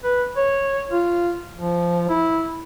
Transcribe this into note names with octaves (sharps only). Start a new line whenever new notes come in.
B4
C#5
F4
F3
E4